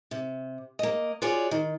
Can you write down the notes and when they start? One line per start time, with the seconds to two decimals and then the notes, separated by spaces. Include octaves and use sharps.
0.11 C3
0.79 A#3 D#5
1.22 F4 F#4 G#4 C#5 D5
1.51 D#3